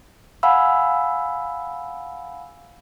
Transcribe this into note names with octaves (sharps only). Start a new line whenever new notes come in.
F5 F#5 G#5 B5 E6